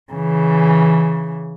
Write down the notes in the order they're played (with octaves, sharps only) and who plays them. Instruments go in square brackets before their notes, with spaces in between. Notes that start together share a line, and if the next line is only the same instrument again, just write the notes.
[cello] C#3 E3